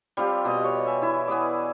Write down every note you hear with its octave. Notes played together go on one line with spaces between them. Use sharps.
G3 C4 F4 G4
B2 D#5
C#5
E5 G#5
E3 E4
B3 G#4 D5